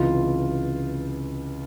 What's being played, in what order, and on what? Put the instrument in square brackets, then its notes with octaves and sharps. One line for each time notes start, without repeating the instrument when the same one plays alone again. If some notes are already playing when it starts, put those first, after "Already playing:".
Already playing: [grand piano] C#2 C3 E3 F4